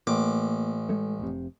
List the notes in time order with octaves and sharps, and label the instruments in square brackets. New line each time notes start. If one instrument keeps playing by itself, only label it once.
[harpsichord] A1 D6 [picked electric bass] A#3
[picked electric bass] G#3 A3
F1 C3